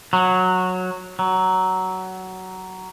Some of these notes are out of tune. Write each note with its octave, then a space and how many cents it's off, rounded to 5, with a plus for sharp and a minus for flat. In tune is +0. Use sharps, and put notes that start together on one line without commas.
F#3 -10
F#3 +15